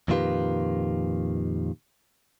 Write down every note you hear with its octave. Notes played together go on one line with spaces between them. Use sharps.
F2 A#2 D#3 F4 G4 B4